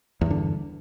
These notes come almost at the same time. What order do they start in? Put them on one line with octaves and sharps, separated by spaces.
E2 G2 D3